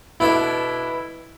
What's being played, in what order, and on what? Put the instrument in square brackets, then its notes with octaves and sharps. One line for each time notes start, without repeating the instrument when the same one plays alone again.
[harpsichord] B2 B3 D4 A4 [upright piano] E4